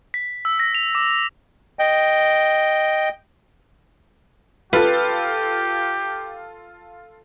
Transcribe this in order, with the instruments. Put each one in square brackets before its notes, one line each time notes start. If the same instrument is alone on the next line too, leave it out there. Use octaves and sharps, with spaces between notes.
[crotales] B6
E6
A#6
F7
D6
[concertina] D#5 G5
[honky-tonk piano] F4 A4 [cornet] G4 [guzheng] B4